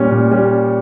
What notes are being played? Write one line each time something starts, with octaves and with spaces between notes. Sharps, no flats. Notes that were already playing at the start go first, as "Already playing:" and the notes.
Already playing: A#2 G3 C#4
A#2
G3 C#4